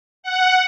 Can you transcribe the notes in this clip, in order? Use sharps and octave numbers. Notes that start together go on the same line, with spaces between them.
F#5